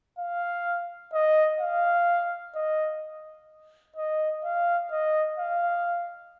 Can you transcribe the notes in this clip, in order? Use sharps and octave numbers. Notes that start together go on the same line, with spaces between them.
F5
D#5
F5
D#5
D#5
F5
D#5
F5